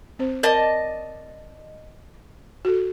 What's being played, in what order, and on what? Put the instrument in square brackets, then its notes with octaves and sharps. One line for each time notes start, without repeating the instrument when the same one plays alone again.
[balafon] C4 C5
[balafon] A#4 [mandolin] D5 D#5 A5
[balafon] F#4 A4